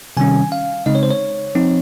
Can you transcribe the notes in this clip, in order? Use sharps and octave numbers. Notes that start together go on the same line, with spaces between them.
C3 D#3 G3 C#4 G#5
F5
C#3 G#3 C4 D#4 D#5
C#5
C5
C#5
F3 C4 D#4